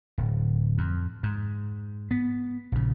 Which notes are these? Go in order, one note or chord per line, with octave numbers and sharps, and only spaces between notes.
D1
F2
G#2
B3
A#1 C#3